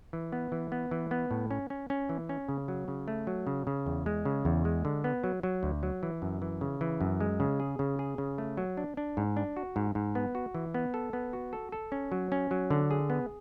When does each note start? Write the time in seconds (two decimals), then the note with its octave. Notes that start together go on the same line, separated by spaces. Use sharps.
0.13 E3
0.32 B3
0.52 E3
0.72 B3
0.91 E3
1.11 B3
1.31 A2
1.51 C#4
1.70 C#4
1.90 C#4
2.09 E3
2.29 C#4
2.49 C#3
2.68 F#3
2.88 C#3
3.08 A3
3.27 F#3
3.47 C#3
3.67 C#3
3.86 E2
4.06 G#3
4.25 C#3
4.45 E2
4.65 G#3
4.85 D3
5.04 B3
5.24 F#3
5.43 F#3
5.63 D2
5.83 F#3
6.03 E3
6.22 F#2
6.42 E3
6.61 C#3
6.81 E3
7.01 F#2
7.21 G#3
7.40 C#3
7.60 G#4
7.79 C#3
7.99 G#4
8.18 C#3
8.38 A3
8.57 F#3
8.77 D4
8.97 D4
9.17 G#2
9.37 D4
9.57 F#4
9.76 G#2
9.95 G#2
10.15 B3
10.35 F#4
10.55 E3
10.74 B3
10.94 A4
11.13 B3
11.33 F#4
11.53 A4
11.72 A4
11.92 C#4
12.12 F#3
12.32 C#4
12.51 F#3
12.70 D3
12.91 G#4
13.10 B3